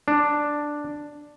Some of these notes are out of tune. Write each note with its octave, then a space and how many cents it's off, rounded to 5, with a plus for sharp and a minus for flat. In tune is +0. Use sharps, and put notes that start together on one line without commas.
D4 +5